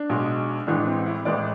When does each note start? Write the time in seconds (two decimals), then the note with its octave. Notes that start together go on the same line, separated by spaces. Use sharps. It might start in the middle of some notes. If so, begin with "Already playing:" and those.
Already playing: D4
0.09 B1 B2 G#3
0.67 A1 A2 E3 G#3 D4
0.86 C4
1.06 E4
1.25 A1 A2 E3 G#3 D5